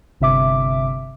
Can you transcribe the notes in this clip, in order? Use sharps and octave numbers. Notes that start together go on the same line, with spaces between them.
G1 C3 E5 D6